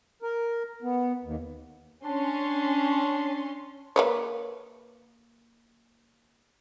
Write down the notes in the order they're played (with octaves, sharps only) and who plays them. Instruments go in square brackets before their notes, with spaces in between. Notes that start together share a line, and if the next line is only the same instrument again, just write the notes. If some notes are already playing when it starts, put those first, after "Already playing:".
[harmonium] A#4
B3
D#2
[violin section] C#4 C6 [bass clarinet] D4
[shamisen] A#3 B4 C#5